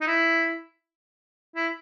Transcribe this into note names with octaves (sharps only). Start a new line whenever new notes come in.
D#4
E4
E4